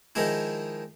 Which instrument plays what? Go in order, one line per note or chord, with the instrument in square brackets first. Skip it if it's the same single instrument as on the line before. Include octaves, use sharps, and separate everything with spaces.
[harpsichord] D#3 F3 G#3 E4